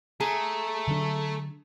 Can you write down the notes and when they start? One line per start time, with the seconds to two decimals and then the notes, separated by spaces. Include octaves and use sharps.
0.20 A3 G#4 A#5
0.88 D3 F#3 D4